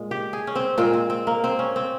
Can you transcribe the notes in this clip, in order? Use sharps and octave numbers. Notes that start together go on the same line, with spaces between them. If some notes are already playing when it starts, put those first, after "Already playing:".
Already playing: A#2 G#3
G4
G#4
C#4
C4
A#2 G#3 C4
C4
C4
A#3
C4
C#4
C4